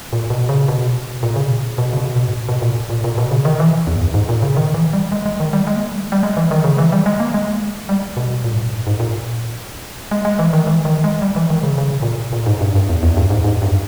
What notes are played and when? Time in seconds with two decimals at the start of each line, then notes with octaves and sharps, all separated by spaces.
0.13 A#2
0.30 B2
0.49 C#3
0.68 B2
1.23 A#2
1.36 C#3
1.44 B2
1.52 A#2
1.78 B2
1.93 C#3
1.97 B2
2.16 B2
2.27 G#2
2.34 A#2
2.49 B2
2.62 A#2
2.90 A#2
3.04 A#2
3.18 B2
3.31 C#3
3.45 D#3
3.60 E3
3.87 E2
3.96 G#2
4.01 G2
4.14 G#2
4.29 A#2
4.42 C#3
4.56 D#3
4.74 E3
4.93 G3
5.12 G#3
5.26 G#3
5.40 D#3
5.53 G3
5.67 G#3
5.76 A#3
5.85 G#3
5.95 G3
6.12 G3
6.23 G#3
6.37 E3
6.51 D#3
6.64 C#3
6.78 E3
6.92 G3
7.06 G#3
7.20 A#3
7.34 G#3
7.89 G3
8.17 B2
8.44 A#2
8.53 G#2
8.59 A#2
8.69 G#2
8.73 G2
8.87 G#2
9.00 A#2
10.11 G#3
10.25 G#3
10.39 E3
10.53 D#3
10.67 E3
10.85 D#3
11.04 G#3
11.22 G3
11.36 E3
11.50 D#3
11.63 C#3
11.78 C#3
11.90 B2
12.02 A#2
12.15 B2
12.33 A#2
12.46 G#2
12.61 G2
12.75 G2
12.89 E2
13.03 E2
13.17 G2
13.30 G#2
13.44 G#2
13.56 E2
13.62 G2